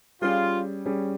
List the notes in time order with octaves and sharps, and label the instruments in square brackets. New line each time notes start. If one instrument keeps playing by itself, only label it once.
[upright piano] G3 C#4 G#4 [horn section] F4
[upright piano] G3 C#4 G#4